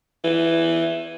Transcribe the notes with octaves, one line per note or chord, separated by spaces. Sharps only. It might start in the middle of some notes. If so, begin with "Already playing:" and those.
E3